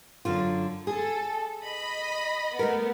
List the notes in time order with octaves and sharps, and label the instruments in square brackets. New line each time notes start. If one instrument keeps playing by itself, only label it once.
[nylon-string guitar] F#2 D3 F4
[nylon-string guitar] G#4 [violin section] A4
[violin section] D#5 B5
[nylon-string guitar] A3 A#4 [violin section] B3